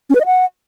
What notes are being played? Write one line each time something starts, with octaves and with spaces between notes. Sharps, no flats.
C#4
B4
D#5
F#5